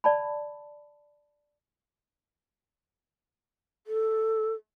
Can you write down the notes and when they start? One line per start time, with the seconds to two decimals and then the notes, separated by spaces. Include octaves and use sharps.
0.04 D5 A5 B5
3.87 A4